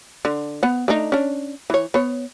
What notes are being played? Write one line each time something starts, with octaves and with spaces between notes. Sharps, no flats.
D3
B3 F#5
A3 D4 D#4
C#4 D4
E3 C#5
B3 C#5